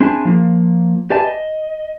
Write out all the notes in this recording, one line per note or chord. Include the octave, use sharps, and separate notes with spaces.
C4 D4 E4 G#4 G#5 A5
F3 A#3
G4 B4 D5 E5 G#5 A5
D#5